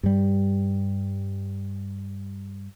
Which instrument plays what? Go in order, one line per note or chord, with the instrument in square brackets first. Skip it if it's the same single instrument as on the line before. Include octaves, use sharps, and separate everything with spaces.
[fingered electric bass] G2 G3